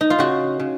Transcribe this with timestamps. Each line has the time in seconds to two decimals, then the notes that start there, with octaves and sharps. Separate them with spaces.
0.01 D#4
0.10 F4
0.19 C#3 F#4
0.60 C#3